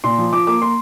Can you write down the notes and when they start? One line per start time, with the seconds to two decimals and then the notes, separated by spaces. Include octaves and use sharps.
0.04 A#2 C6
0.18 F3
0.33 F3 D6
0.47 A#3 D6
0.62 A#3 C6